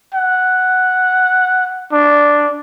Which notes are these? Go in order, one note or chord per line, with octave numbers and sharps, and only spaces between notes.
F#5
D4